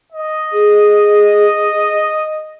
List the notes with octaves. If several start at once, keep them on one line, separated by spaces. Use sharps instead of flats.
D#5
G#4